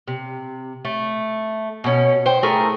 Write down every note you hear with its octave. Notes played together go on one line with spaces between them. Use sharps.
C3
A3
B2 C#4
C5 G5
A3 E4 G#4 A#4